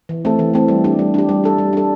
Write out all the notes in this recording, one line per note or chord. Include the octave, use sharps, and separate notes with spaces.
E3
A3 C4 A4
E3
A3 C4 A4
G3
D4 G4
G3
D4 G4
G3
D4 A4
G3
D4 A4